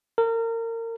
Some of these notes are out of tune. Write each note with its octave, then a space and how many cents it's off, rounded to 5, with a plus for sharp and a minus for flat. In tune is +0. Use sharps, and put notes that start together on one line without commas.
A#4 -30